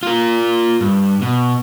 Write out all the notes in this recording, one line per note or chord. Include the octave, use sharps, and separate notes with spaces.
F4 A#4
G2
B2